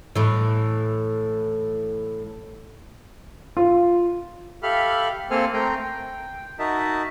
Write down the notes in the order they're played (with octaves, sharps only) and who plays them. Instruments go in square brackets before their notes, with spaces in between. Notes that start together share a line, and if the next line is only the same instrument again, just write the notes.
[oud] A2 E3
[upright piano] F4
[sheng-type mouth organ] G4 A4 E5 F5 B5 F6
A#3 C4 A4 C5 G#5 F6
A3 C4 A#4 G5 A#5 C6
G5
D#4 F#4 A#4 D#5 E5 A5